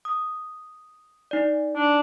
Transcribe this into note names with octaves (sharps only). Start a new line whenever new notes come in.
D#6
D#4 D5
D4